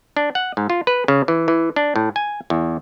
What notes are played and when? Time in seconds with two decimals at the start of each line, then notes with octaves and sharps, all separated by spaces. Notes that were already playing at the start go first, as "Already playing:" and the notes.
0.16 D4
0.35 F#5
0.57 G#2
0.70 F4
0.87 B4
1.08 C#3
1.28 E3
1.48 E3
1.76 D4
1.96 A2
2.16 G#5
2.50 E2